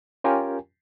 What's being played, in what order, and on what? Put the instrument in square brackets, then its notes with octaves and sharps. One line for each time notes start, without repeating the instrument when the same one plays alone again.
[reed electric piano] C#4 F4 G4 A#4 G5 G#5